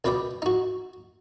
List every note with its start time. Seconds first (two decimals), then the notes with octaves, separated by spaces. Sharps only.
0.04 C#2 B2 B4 D5 G5 D6
0.42 D#4 F#4